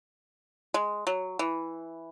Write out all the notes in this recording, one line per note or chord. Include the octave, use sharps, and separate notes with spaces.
G#3
F#3
E3